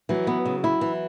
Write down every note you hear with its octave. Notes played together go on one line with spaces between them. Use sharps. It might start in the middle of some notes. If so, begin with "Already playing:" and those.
E3 F#3
B3
C#3
E4
E3